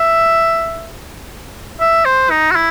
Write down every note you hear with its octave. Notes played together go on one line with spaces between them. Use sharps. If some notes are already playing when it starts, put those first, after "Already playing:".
Already playing: E5
E5
C5
D#4
F#4
E4